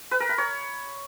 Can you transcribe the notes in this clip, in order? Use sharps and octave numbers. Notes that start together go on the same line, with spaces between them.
B4
A#4
B5
C#5